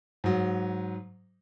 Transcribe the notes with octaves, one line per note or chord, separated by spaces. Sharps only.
G#2 F#3